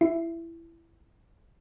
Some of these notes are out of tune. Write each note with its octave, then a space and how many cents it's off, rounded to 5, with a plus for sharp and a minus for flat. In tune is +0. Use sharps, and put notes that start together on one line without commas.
E4 +15